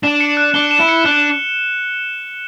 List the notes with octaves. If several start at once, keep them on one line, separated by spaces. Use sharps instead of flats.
D4 E7
C#7
F#6
D4 G7
E7
E4
C#7
D4 F#6